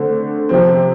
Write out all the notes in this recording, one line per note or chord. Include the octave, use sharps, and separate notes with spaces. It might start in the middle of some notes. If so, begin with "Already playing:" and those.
Already playing: D3 A3 C4
C3 F3 C4